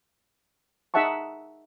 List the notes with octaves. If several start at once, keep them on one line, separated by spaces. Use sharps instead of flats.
D#4 G#4 E5 F#5 A5 C#6